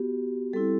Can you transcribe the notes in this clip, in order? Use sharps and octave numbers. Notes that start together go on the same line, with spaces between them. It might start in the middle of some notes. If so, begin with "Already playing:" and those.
Already playing: B3 F#4 G4
G3 C4 E4 A4